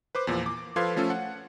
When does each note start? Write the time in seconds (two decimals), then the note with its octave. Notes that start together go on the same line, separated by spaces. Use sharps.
0.15 B4 C5 D6
0.27 E2 A#2 F3
0.46 D6
0.76 F3 A4 B4 F5 C6 G#6
0.96 F3 A3 C#4 F4 A4
1.10 F#5